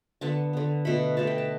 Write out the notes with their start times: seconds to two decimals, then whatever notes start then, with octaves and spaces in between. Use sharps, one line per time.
0.21 D3 B3 A5
0.53 D3 B3
0.85 B2 A3 B5
1.17 B2 A3 A5
1.27 G5
1.38 A5